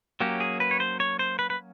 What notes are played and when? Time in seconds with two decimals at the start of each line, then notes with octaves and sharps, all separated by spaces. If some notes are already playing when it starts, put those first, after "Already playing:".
0.20 F#3 A#3 C#4 G4
0.40 G#4
0.60 B4
0.71 C#5
0.80 C5
1.00 C#5
1.19 C5
1.39 B4
1.50 B4